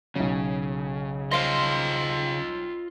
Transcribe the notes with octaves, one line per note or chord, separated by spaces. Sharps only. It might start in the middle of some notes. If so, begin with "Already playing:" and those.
B1 C#3 F#3
F4 C5 D#5 F5